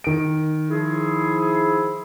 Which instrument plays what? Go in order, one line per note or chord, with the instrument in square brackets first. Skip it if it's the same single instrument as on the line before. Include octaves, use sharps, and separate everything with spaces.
[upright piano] D#3 D7
[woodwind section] F3 E4 G#4